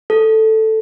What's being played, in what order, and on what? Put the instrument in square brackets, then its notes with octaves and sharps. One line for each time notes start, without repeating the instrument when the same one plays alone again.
[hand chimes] A4